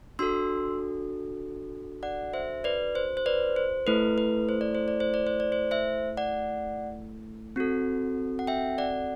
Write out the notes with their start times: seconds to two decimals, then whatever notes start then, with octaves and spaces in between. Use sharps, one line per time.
0.19 D4 F#4 A4 C6 E6
2.03 D5 F#5
2.33 C5 E5
2.64 B4 D5
2.95 C5
3.17 C5
3.26 B4 D5
3.56 C5
3.87 A3 E4 A4 B4
4.18 B4
4.49 C5
4.61 D5
4.75 C5
4.88 D5
5.00 C5
5.14 D5
5.27 C5
5.40 D5
5.52 C5
5.71 C5 E5
6.17 D5 F#5
7.56 C4 F#4 A4
8.39 F#5
8.47 E5 G5
8.78 D5 F#5